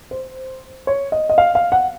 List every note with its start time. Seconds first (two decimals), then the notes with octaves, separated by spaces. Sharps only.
0.11 C5
0.87 C#5
1.12 D#5
1.29 D#5
1.38 F5
1.55 F5
1.72 F#5